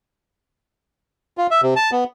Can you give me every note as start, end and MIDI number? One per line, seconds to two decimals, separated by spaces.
1.38 1.47 65
1.51 1.61 76
1.62 1.74 48
1.76 1.90 81
1.92 2.04 59